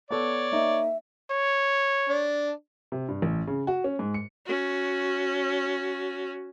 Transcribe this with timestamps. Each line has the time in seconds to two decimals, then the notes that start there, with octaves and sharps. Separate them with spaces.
0.11 B3 A4 C#5 D5
0.52 A#3 D#4 D#5 E5
1.30 C#5
2.09 D4
2.92 C3
3.08 G2
3.22 A1
3.47 C#3
3.67 F#4
3.84 C#4
3.99 G#2
4.14 C#7
4.45 C#4 F#4